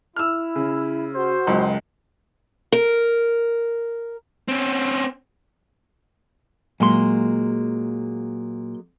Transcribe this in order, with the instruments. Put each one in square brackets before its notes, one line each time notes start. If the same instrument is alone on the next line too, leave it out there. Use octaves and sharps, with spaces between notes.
[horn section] E4 [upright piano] E6 F6
[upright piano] C#3
[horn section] F#4 C5
[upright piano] F#1 C#2
[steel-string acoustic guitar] A#4
[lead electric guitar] C4 C#4
[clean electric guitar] A#2 C6 [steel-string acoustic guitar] F#3 G#3 A#3